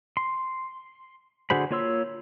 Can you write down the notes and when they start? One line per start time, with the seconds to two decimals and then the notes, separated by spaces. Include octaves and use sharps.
0.17 C6
1.50 D3 F#4 G#4 C5 B5
1.71 A#3 F4 C#5 C6 E6